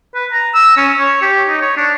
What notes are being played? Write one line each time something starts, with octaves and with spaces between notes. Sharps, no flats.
B4
A#5
E6
C#4
C#5
G4
D#4
C#5
D4